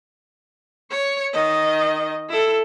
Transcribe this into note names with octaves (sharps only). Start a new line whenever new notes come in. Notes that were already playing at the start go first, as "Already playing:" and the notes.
C#5 C#6
D#3 D#5
E4 A4